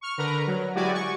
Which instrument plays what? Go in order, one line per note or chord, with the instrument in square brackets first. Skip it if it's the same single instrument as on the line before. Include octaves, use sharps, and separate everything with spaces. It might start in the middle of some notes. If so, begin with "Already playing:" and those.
[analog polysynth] C#6 F6
D3 A#4 B4 A#5
F#3
G#3 E4 F#4 G4 D5 G#5
C#6